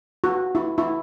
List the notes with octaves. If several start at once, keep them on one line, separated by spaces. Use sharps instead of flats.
F#4
E4
E4